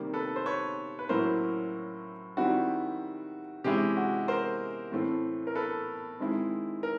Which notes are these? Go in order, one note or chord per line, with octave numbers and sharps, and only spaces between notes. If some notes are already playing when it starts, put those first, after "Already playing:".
Already playing: C3 D#3 G3 A#3
A4 B4
C5
B4 C#5
B4
A2 F#3 A#3 C#4 E4 A#4 C5
D#3 G3 C4 E4 F#4
C3 E3 G#3 C#4 E4 G4
F#4
A#4 C5
A2 E3 A3 C4
A#4
A4 B4
D#3 G#3 C4 E4
A#4